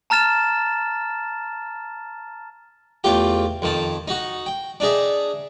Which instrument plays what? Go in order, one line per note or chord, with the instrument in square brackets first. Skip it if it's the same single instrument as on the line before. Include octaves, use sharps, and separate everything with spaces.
[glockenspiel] A5 A#5 F6 A6 E7
[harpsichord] E2 A3 F4 G4 G5
F2 D#3 A5
D#4 F#4
G5
D4 D#4 G#4 E5